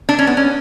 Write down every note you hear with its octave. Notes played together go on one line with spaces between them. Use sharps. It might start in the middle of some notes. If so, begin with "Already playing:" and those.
D4
C#4
B3
C#4